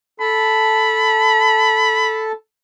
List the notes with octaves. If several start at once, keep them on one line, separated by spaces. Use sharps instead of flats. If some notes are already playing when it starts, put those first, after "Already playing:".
A4 A5 B5